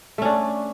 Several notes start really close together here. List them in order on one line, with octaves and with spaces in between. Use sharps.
A3 C#4 D4